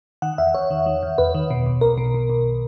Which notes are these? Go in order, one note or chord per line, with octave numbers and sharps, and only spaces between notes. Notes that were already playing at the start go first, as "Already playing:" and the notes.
D#3 F#5
E2 E5
E2 C#5
D#3
D#3
E2
E2 B4
D#3
B2
B1
B1 A#4
B2
B2
B1